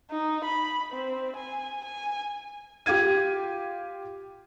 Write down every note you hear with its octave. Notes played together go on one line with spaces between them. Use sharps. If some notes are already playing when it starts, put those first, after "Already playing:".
D#4
B5
C4
G#5
G#5
F4 G4 F5 G#6 D#7